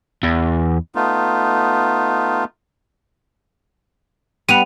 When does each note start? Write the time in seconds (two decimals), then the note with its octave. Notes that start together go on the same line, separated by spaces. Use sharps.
0.23 E2
0.95 A3 B3 D#4 F4
4.49 G3 B3 F#5 D#7 F7